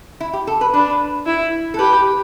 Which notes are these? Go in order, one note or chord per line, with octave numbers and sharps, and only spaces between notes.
E4
G4
A4
B4
D4 B4
E4
A4
G4 B4